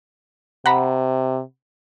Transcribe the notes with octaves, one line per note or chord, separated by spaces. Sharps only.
C3 F#5 A#5 B5